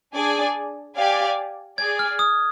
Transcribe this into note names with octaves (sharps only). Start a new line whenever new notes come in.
D4 G#4 D5 G#5
G4 D5 F5 G#5
G#4 D5 G#5 G#6
F6
D#6